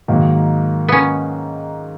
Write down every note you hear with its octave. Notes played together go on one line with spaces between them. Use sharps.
G#2 D#3 F#3 A#3
B3 C#4